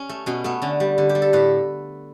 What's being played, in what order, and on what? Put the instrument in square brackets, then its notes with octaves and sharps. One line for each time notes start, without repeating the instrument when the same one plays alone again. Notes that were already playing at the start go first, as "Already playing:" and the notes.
Already playing: [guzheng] C#4
A3
B2 C#4
A3 B3
D3 C#4
G3
D3
G4
G3
A4
A2 B4